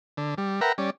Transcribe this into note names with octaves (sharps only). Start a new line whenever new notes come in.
D3
G3
A#4 B4 E5 F#5 G5 A#5
G3 C#4 D5